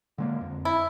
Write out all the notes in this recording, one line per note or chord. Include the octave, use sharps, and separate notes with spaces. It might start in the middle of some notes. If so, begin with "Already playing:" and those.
D3 G#3 A#3
F2
E4